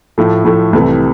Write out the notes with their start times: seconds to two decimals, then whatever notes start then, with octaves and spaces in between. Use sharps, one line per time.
0.18 A2 F3 A3
0.45 A2 F3 A3
0.73 C2 C3 E3 A3